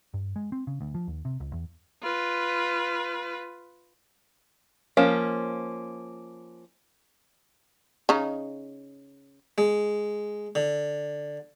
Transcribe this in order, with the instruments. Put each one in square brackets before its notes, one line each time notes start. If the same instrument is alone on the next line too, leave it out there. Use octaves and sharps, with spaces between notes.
[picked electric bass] G2
G#3
C4
C#3
D2
F3
D#2
C3
C#2
E2
[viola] F4 B4
[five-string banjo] F3 A#3 C#4
[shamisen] C#3 D#4
[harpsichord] G#3
D3